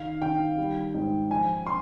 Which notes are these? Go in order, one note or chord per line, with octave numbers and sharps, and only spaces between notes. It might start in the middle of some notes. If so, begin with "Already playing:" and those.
Already playing: D#3 F5
D#3 G5
G3
G#2
F3 G#5
C6